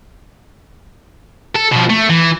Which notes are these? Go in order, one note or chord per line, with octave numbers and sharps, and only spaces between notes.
A4
B2 F3
A3
E3